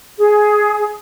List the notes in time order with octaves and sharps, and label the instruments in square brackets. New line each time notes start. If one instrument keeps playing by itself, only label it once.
[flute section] G#4